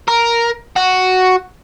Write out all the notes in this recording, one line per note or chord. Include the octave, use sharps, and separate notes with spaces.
A#4
F#4